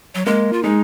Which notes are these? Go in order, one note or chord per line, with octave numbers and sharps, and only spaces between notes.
F#3
G#3 A#3
F4
G#3 D#4